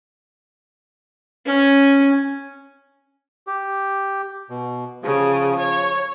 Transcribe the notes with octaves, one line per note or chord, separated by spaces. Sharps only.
C#4 G#5
G4
B2
C#3 F3
C#5